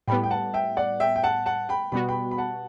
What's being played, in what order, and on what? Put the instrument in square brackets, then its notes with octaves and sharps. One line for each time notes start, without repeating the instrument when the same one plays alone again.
[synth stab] A2 G3 B3 [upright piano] G5 B5
[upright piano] G5
F#5 A5
E5 G5
D5 F#5
E5 G5
G5
F#5 A5
F#5 A5
G5 B5
[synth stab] B2 G3 B3 F#4 [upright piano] B5
[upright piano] G5 B5
B5
F#5 A5